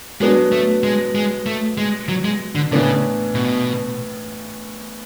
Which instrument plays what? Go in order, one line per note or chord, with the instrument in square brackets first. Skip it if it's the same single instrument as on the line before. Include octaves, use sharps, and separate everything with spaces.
[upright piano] F#3 B3 D4 [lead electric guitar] G#3
[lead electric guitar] A3
G#3
G#3
A3
G#3
F#3
G#3
D3
[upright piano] A2 E3 B3 D4 [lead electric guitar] C#3
[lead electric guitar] B2